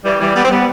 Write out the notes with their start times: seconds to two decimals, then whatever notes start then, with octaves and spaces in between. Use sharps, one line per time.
0.05 E3 G3
0.19 E3 G3
0.36 G3 B3
0.45 C4
0.50 G3 B3